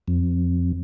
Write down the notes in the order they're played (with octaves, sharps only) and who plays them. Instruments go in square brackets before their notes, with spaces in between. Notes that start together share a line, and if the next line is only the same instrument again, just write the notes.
[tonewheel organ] F2